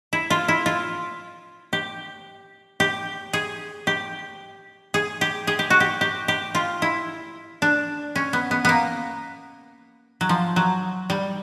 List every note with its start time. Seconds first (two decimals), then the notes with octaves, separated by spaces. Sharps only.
0.13 E4
0.30 F4
0.48 E4
0.66 F4
1.73 G4
2.80 G4
3.33 G#4
3.87 G4
4.94 G#4
5.21 G4
5.47 G#4
5.59 G4
5.70 F#4
5.80 G4
6.01 G4
6.28 G4
6.55 F4
6.82 E4
7.62 D4
8.16 C#4
8.33 B3
8.51 B3
8.65 A#3 B3
10.21 F#3
10.29 F3
10.56 F#3
11.10 G3